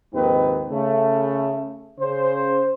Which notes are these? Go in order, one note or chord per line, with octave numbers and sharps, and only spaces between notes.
A#1 D#2 G#2 D#3 C4 B4
C#3 A3
C#3 C5